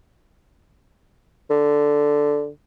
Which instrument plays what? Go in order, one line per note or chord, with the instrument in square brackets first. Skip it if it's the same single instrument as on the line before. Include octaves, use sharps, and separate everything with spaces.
[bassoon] D3